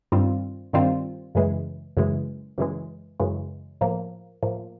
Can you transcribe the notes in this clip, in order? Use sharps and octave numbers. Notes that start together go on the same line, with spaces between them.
G2 D#3 G3 C4 F4
G2 D#3 G3 C4 F4
F#2 C#3 E3 G#3
F#2 C#3 E3 G#3
F#2 C#3 E3 G#3
F#2 C#3 E3 G#3
A2 F3 A#3
A2 F3 A#3